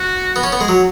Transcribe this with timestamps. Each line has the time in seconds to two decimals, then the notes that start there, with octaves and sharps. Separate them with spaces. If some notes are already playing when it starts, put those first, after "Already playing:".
Already playing: F#4
0.36 B3
0.43 C#4
0.52 B3
0.61 G#3
0.68 F#3